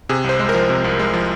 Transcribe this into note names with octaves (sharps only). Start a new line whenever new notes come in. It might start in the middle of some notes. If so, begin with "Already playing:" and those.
C3 G#4
C2 C5
G#3
A#4
F3
C3
C2
G#3
F3